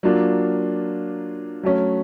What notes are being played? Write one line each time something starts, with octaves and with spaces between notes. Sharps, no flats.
F#3 A#3 D4 F4
F#3 A3 C#4